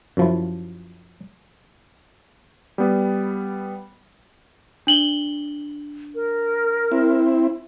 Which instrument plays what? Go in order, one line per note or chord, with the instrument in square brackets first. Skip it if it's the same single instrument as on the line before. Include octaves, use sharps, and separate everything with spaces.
[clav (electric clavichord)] F#2 F3 E4
[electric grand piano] G3 B3
[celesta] D4 F#7 G7
[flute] A#4
[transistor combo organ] C4 E4